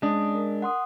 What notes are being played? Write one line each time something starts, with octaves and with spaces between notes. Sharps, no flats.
G#3 C#4 D4 D#6
A#4
F#5 C6 D#6